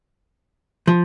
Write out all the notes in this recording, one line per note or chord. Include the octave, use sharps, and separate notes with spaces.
F3